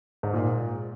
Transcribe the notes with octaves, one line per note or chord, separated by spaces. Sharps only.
G#2
A#2